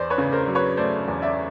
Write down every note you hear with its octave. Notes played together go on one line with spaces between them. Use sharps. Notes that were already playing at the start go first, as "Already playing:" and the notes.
Already playing: E2 C5 D5
B4 C#5
C#3
A#4 C5
F#3
B4 C#5
A3 C5 D5
E2
D5 E5